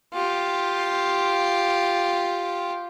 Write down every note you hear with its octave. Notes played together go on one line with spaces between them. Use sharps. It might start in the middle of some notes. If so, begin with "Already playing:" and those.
F4 G4